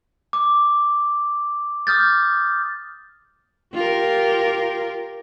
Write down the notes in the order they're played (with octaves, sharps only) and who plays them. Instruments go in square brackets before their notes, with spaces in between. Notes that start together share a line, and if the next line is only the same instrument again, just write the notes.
[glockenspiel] D6
D6 D#6 F6 G6 A6
[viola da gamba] F4 G4 A#4